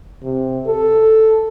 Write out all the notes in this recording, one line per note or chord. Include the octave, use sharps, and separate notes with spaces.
C3
A4